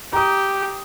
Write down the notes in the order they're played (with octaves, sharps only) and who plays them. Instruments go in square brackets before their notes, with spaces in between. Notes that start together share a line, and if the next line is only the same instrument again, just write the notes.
[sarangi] G4 [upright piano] A#5 D#6